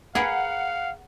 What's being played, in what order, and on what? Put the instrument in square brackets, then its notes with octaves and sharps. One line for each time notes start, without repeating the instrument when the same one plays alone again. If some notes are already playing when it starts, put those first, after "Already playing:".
[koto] G#4 A#4 B4 [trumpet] F5 [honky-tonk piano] F#5